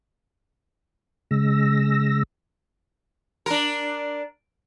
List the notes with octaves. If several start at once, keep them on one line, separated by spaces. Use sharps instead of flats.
C#3 G#3 E6 A#6
D4 A#4